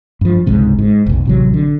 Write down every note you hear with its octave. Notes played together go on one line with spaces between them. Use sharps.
G2 F3
G1 C#2 G#2 C3
G#2
F1 B1
A1 C3 F#3
D3